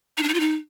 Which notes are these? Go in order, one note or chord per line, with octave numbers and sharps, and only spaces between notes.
D#4
D4
D#4
F4
D#4